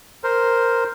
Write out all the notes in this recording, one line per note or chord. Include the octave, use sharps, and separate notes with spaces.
A#4 C5